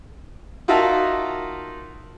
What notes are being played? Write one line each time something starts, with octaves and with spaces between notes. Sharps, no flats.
D#4 F4 F#4 A#4 E5 A5